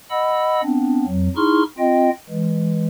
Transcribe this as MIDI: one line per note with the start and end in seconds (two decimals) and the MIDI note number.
0.10 0.61 75
0.10 0.61 78
0.10 0.61 83
0.10 0.61 88
0.64 1.05 59
0.64 1.05 60
0.64 1.05 62
1.06 1.28 41
1.06 1.28 54
1.36 1.63 63
1.36 1.63 64
1.36 1.63 68
1.36 1.63 84
1.36 1.63 85
1.36 1.63 89
1.78 2.10 60
1.78 2.10 65
1.78 2.10 75
1.78 2.10 79
2.30 2.88 52
2.30 2.88 56